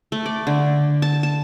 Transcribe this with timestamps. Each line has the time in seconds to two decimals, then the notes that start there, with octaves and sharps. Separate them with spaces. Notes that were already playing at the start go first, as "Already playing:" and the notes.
0.12 A3
0.26 D5
0.47 D3
1.02 A5
1.23 A5